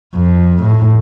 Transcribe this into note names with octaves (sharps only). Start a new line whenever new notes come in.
F2
A2